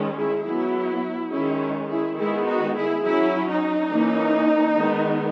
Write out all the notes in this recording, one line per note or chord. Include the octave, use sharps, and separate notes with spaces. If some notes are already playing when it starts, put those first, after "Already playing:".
Already playing: D#3 G#3 C#4
E4 G#4
F#3 B3 E4
D#3 G#3 C#4 E4 G#4
E4 G#4
D#3 G#3 B3 E4 G#4
D#4 F#4
E4 G#4
F#3 C#4 E4
D#4
E3 A#3 C#4
D#3 G#3 B3